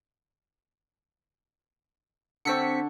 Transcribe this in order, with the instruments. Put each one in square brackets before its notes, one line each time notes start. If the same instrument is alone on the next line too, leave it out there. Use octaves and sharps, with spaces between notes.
[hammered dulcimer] D3 A4 C#6 [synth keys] C4 B6 C#7